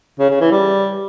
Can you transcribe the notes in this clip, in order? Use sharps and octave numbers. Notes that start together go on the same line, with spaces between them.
C#3
C#3
E3
G3